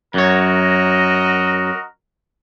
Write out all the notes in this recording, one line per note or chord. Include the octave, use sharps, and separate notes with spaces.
F#2 F#4 A#4 C#5 D#5